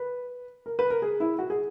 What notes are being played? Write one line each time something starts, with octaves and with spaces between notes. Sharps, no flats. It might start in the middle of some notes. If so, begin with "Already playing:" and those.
Already playing: B4
A#4
B4
A#4
G#4
E4
F#4
G#4